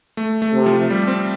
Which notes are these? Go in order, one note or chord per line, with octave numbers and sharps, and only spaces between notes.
A3
A3
C3
F3
G3
C4